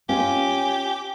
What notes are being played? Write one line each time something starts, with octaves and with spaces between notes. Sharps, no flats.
C#4 F4 G4 G#5